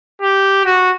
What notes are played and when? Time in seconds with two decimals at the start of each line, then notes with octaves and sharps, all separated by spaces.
0.22 G4
0.65 F#4